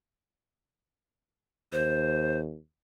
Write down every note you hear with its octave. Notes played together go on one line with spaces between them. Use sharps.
D#2 C5